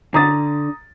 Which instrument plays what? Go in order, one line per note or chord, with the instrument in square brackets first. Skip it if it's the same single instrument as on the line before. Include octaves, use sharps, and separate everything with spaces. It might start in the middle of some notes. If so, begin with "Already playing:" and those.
[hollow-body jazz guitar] D3 [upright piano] A#5 D#6 A6